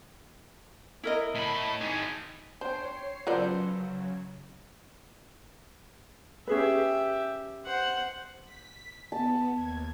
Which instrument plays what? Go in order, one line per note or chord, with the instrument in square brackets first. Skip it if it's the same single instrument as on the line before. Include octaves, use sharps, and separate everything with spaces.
[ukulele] E4 A#4 D#5
[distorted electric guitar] A2 B5
D#3 G#4
[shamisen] D4 [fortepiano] C5 G5 [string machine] C#5 C7
[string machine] C#3 F#3 [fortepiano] B3 A4 C5 [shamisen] F4 A#4 D5
[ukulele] C#4 G#4 B4 [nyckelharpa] G4 E5
[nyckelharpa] C5 F#5
[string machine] B6
[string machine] B3 [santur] A5
[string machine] D#2 G#6